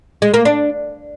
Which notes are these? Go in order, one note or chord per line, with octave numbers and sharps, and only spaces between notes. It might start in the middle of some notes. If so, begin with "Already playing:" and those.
G#3
A#3
D4